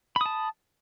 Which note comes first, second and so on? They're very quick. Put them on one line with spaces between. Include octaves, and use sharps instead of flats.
B5 D#6 A5